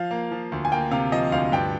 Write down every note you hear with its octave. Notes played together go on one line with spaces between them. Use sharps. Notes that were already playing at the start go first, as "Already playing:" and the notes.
Already playing: F3 F5
A#3
F3
D2
G#5
A#3 G5
C3 F5
F3 D#5
D2 F5
G2 G5